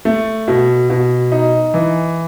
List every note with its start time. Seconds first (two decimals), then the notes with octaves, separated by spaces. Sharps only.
0.05 A3
0.48 B2
0.90 B2
1.32 D#4
1.74 E3